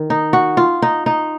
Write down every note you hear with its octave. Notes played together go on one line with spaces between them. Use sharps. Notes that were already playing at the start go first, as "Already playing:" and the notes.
Already playing: D#3
D#4
F#4
F4
D#4
D#4